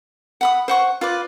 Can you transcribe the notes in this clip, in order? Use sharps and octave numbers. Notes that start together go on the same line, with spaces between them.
F#5 B5 D#6
C5 F#5 C#6
F4 B4 D5